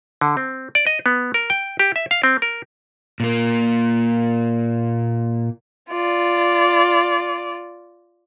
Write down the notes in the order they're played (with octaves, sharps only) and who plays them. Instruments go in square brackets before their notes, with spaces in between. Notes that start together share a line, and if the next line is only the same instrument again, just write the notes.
[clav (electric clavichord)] D3
C4
D5
D#5
B3
A#4
G5
G4
E5
F5
C4
A#4
[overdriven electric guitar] A#2 A#3
[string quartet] F4 D5